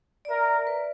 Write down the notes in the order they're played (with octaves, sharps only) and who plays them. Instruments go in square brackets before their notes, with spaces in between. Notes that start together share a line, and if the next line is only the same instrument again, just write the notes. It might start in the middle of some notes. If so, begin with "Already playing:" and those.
[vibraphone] D5
[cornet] A#4 [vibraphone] E5
[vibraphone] B4